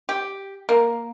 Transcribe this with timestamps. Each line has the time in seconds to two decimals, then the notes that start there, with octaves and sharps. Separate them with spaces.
0.09 G4
0.69 A#3